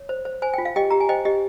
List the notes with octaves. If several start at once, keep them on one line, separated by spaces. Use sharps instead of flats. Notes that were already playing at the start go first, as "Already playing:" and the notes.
Already playing: C#5
C5
C5
C5 G#5
F4 G5
F5
G4 D#5 G5
G4 A#5
G#5
C5 D#5 G5
G4 D#5